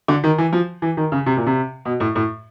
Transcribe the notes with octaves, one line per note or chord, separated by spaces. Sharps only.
D3
D#3
E3
F3
E3
D#3
C#3
C3
A#2
C3
B2
A2
A2